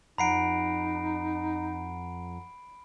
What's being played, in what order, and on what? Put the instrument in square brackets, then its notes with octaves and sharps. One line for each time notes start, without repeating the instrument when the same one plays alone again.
[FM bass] F2 [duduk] D#4 [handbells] F#5 A#5 [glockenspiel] B5 C7 D7